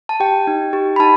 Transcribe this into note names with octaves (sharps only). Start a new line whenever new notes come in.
A5
G4 G5
D#4
G4
B5
D#4 A5